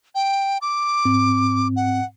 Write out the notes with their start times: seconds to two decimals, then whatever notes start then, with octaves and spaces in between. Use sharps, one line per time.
0.15 G5
0.62 D6
1.05 G#2 C4
1.76 F#5